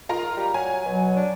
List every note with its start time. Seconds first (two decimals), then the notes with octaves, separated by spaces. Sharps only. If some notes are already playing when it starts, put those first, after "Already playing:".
0.09 D#3 F4 A#4 A#5
0.37 G3
0.54 F#3 G#5
0.86 B2 F#3
1.16 D4